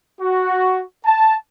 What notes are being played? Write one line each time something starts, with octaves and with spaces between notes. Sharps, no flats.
F#4
A5